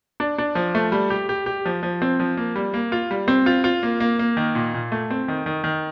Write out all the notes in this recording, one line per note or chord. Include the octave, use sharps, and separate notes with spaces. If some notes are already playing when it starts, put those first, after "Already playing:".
D4
D4
F3
A3
G3
G4
G4
G4
F3
F3
C4
F3
A#3
G3
A#3
F4
G3
C4
F4
F4
A#3
A#3
A#3
D#3
A#2
A#2
A3
C4
D#3
D#3
D#3